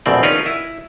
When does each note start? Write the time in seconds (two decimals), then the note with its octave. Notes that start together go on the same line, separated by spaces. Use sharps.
0.06 A#1 E2 B2 A3 C4 D5
0.23 C#4 D#4 F4 A#4 B4
0.46 E4